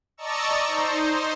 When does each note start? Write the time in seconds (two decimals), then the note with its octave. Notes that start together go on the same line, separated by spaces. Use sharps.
0.17 D5 D#5 A5 A#5 C#6 E6
0.68 D#4 C5